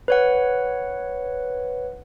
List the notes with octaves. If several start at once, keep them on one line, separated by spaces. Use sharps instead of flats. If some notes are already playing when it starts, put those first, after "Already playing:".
B4 C#5 F#5